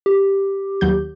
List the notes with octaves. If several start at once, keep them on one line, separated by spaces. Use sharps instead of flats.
G4
D#2 F#3 G6